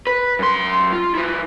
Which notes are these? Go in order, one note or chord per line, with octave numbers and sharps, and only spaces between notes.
B4
F#2 C6
F4
F3 E4